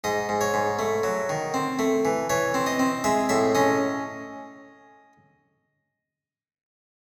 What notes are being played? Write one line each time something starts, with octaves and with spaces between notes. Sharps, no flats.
G#2 D#5
G#2
C#5
G#2
A3
F#3
D#3
C4
A3
E3
E3 C#5
C4
D#5
C4
G#3 E5
A2 E5
C#4 D#5